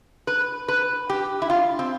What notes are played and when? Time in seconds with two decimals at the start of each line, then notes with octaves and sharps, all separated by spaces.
0.27 B4
0.68 B4
1.10 G4
1.42 E4
1.50 F4
1.79 C4